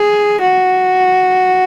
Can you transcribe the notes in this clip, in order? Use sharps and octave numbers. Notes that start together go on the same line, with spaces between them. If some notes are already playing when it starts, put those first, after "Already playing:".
Already playing: G#4
F#4